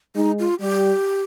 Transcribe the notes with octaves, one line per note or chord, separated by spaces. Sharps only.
G#3 D#4
F4
G3 G4